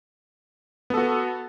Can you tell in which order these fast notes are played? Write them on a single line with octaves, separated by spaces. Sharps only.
B3 A4 F#4